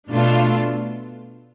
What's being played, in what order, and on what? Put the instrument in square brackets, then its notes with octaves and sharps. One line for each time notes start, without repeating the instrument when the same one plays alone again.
[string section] B2 A3 D4 F4 A4